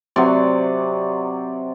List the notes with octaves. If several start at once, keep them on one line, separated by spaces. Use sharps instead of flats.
C3 F#3 D5